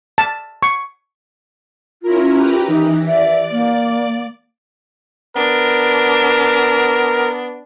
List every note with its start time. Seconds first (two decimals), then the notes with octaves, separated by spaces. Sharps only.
0.18 A5
0.62 C#6
2.03 C#4 E4 F4 A#4
2.36 G4 B4 A#5
2.68 E3 D#4
3.07 D5 E5
3.51 A#3
5.36 B3 D4 A#4